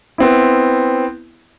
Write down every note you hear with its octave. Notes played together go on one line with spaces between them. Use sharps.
B3 C4 E4